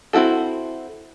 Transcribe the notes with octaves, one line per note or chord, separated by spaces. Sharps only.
C4 E4 F#4 A4